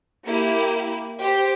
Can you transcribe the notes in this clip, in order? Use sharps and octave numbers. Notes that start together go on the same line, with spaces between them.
A#3 E4 G4
G4 C5